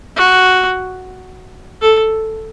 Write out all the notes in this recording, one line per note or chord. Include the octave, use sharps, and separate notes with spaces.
F#4
A4